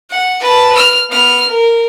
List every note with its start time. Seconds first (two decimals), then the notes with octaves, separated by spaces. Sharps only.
0.10 F#5
0.40 B4 A5
0.75 F6
1.10 B3 F6
1.48 A#4